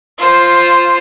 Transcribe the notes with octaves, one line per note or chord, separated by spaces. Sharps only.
F4 C5